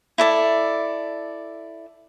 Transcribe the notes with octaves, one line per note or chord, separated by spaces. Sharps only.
E4 A4 D5